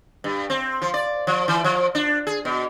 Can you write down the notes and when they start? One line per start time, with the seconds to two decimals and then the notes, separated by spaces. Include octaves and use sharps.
0.24 G2
0.50 C4
0.82 F3
0.94 D5
1.27 F3
1.48 E3
1.64 F3
1.95 D4
2.27 G#4
2.45 B2